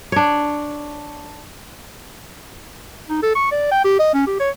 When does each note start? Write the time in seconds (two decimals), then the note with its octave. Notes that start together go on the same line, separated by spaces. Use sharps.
0.12 D4 C#5
3.10 D#4
3.23 A4
3.35 C#6
3.52 D5
3.71 G5
3.84 G4
3.99 D#5
4.14 C#4
4.27 G4
4.40 C#5